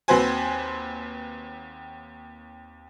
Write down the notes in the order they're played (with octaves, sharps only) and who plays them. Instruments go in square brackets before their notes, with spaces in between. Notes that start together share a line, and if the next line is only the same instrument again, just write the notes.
[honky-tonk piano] D#2 C4 F#4 B4 C5 G#5